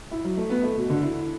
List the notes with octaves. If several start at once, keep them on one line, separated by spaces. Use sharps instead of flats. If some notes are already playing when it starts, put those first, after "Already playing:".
E4
F#3
A3
B3
A3
B2
D3
E4